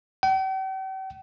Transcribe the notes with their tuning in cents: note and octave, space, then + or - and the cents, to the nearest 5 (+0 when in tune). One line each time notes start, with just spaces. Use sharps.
G5 -45